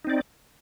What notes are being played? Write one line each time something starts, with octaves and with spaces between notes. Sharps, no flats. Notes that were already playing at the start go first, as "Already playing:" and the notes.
C4 D#4 D5